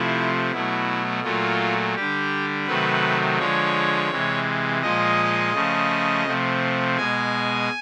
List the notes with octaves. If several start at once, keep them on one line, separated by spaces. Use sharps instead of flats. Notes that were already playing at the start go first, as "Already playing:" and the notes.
Already playing: C3 F3 A3 E4
B2 F#3 A3 E4
A#2 F#3 A3 F4
D3 G3 G4
C3 D#3 F#3 A3 B4
D3 F3 G#3 C#5
C3 E3 G#3
A#2 F3 G#3 D#5
C#3 F3 A3
C3 F3 A3
B2 G#3 G#5